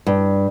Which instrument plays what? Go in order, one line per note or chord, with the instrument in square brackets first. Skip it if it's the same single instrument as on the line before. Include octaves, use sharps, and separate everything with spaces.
[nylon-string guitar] G2